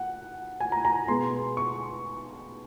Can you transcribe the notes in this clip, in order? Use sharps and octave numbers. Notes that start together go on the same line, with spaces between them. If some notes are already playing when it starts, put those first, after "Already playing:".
Already playing: F#5
G#5
A#5
A#5
B2 G#3 B3 C6
C#6